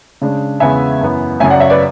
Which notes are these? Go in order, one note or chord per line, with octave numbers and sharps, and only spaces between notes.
C#3 G#3 D4
E2 C#3 G#3 B3 E5 G#5
F#2 E3 B3
F#2 C#3 F#3 E5 G#5
D5 F#5
C#5 E5
B4 D5